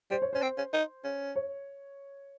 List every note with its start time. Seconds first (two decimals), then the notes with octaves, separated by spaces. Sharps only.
0.11 G3 C5
0.22 C#5
0.33 C#4 C5
0.42 C4
0.58 C#4
0.73 D#4
1.04 C#4
1.36 C#5